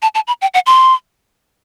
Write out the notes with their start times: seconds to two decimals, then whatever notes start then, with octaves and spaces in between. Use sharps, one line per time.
0.02 A5
0.15 A5
0.27 B5
0.42 G5
0.54 F#5
0.66 C6